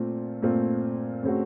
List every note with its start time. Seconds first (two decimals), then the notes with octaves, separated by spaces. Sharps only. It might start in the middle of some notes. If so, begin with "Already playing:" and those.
Already playing: A#2 A3 C4 F4
0.42 A#2 A3 C4 F4
1.23 C#3 A3 C4 F#4